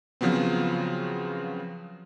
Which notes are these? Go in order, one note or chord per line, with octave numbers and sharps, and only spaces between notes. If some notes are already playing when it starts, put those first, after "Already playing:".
C#3 F3 F#3 B3 C4